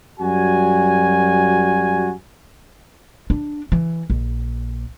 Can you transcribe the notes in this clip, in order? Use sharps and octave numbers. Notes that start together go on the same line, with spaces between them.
F#2 G3 F#4 G#5
D4
E3
A#1